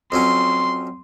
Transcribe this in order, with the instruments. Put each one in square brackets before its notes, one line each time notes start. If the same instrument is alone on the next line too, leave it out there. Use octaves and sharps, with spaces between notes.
[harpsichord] F2 F#3 C#4 [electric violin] C6